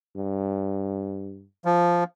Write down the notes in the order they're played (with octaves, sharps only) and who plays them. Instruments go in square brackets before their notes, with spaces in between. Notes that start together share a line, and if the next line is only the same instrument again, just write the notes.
[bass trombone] G2
[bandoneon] F3